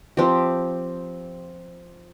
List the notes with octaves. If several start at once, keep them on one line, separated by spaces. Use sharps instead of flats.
F3 C4 G4